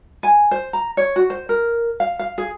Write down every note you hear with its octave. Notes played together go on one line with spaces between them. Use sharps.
G#5
C5
A#5
C#5
F#4
C5
A#4
F5
F5
G#4